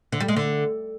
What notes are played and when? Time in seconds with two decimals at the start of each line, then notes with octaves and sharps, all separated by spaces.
0.12 D3
0.20 G3
0.28 G#3
0.36 D3